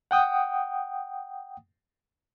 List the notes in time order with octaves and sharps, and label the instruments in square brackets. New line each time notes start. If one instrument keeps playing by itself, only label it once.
[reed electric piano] F#5 G5 D#6